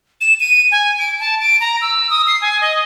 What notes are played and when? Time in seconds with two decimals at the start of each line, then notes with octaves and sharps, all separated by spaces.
0.21 E7
0.40 D#7
0.72 G#5
0.98 D7
1.20 A5
1.41 D7
1.61 A#5
1.82 E6
2.10 D#6
2.28 C7
2.41 G#5
2.61 D#5